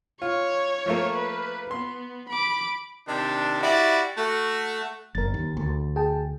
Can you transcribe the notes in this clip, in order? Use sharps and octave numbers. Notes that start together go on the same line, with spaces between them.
F4 C#5
F3 A3 A#3
B4
B3 C6
B5 D6
C3 D#3 D4
G3 E4 F#4 D5
A3 F#4
F#1 A#4 A6
D#2
D2
G#4 G5 A5